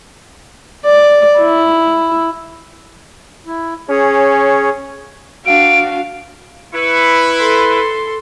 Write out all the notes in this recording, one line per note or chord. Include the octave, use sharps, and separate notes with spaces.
D5
E4
E4
C#4 G#4 C#5
D4 F#4 F5 D7
E4 B4 C#6
A4 C6